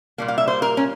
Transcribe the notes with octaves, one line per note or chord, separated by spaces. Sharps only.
A#2 G3 A#3
F5
E5
C5
A#4
C#4